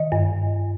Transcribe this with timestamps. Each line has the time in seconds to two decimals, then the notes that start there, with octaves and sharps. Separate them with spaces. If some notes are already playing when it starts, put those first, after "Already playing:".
Already playing: D#3 D#5
0.12 G2